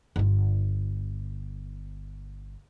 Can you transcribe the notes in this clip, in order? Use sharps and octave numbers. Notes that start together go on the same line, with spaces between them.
G1 F4